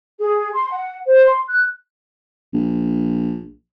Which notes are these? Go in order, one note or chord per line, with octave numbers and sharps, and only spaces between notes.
G#4
C6
F#5
C5
C6
F#6
A#1